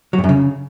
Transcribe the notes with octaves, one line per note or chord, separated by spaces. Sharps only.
F#3
G2
F#2
C#3